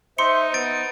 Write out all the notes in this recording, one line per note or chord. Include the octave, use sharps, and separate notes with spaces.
D#4 C5 E5 C6 C#7
B3 A6 D7